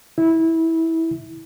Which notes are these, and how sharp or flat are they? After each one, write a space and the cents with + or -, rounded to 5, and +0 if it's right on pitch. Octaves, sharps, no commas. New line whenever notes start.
E4 -15